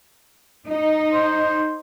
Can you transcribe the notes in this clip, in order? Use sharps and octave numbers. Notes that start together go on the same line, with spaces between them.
D#4
C5